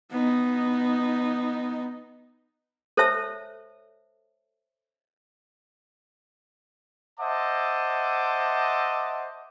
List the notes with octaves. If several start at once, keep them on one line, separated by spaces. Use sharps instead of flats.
B3 D#4
A4 C5 C#5 E5 A5 E6
C5 D#5 E5 F#5 A5 D6